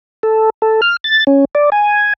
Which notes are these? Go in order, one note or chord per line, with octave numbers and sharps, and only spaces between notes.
A4
A4
F6
A6
C#4
D5
G#5